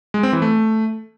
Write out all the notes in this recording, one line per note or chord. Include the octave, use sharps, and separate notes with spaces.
G#3
C4
E3
A3